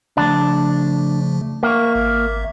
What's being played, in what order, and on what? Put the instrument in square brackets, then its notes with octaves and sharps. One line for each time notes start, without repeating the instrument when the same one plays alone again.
[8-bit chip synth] C#3 F3 A3 [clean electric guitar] D4
[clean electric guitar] A#3 [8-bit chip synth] E5 C#6
[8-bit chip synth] G#1 E5